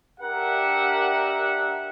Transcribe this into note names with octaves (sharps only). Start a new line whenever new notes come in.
D4 G4 A#4 E5 F#5